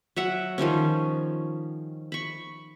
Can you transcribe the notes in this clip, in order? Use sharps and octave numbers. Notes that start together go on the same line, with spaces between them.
F#3 E5 F#5
D#3 F3 G3 C#4
B5 C#6